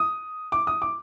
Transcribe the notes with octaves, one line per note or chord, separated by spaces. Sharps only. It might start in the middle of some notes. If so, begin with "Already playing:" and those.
Already playing: D#6
D6
D#6
D6